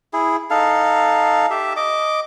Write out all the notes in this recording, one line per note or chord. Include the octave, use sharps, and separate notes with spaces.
E4 G#4
D#4 A4 F5
G4 E5
D#5 D6